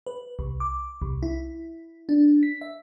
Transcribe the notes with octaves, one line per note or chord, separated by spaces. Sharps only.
B4
C2
D6
C2
E4
D4
B6
E5